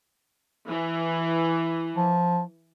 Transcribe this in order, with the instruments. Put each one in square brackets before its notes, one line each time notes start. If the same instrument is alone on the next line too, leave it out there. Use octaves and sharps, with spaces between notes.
[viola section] E3
[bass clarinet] F3